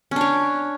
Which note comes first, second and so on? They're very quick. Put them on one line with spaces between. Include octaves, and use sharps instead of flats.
C#4 D4 C#5